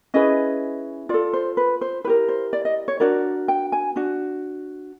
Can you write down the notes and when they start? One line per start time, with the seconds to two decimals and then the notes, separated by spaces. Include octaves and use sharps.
0.14 C#4 E4 G#4 B4 D#5
1.09 F4 A4 D5
1.33 C5
1.57 B4
1.81 C5
2.05 E4 G4 A#4 B4
2.29 C5
2.53 D5
2.65 D#5
2.88 C#5
3.00 D4 F#4 A#4 D5
3.48 G5
3.72 G#5
3.96 D4 F#4